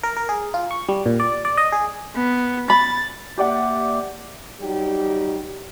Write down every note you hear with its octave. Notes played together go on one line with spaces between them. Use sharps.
A#4
A#4
G#4
F4
C#6
G3
A#2
D5
D5
D#5
G#4
B3
B5 A6
A#3 G4 D5 E5 F#5 D6
F#3 G3 D#4 G4